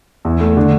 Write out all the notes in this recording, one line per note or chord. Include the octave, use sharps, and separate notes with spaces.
E2
A3
D3